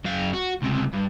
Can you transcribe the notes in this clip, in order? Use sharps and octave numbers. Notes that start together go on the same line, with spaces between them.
F#2 F5
F#4
C#2 C3
G2